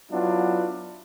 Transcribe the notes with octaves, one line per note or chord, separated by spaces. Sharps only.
F#3 B3 D4 E4 F4